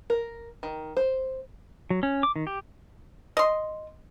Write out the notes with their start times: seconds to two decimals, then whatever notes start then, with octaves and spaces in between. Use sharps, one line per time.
0.10 A#4
0.63 D#3
0.97 C5
1.90 F#3
2.03 C#4
2.23 D6
2.36 D#3
2.47 G4
3.37 D#5 C6